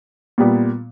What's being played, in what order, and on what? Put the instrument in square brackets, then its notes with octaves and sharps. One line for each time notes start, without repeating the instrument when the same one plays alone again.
[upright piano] A#2 G3 B3